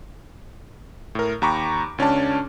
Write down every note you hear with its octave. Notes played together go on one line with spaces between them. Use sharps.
A2 A#4
D#2 G5 A#5 B5 C#6 D6
C#2 C#4 D4 A5